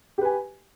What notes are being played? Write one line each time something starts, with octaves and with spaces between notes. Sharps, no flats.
G4 B4 G#5